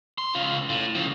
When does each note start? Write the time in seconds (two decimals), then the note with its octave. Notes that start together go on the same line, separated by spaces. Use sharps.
0.18 C6
0.35 C#3 F4
0.69 A2
0.95 C#3 F3